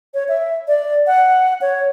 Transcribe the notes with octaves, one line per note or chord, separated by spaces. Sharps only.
C#5
E5
D5
F#5
C#5